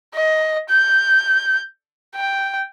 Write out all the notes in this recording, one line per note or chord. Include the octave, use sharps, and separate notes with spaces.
D#5
G6
G5